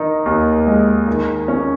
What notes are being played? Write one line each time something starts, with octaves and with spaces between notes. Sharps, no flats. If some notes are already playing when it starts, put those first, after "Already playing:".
Already playing: D#3 D#4
D#2
G#3
D#3
C#4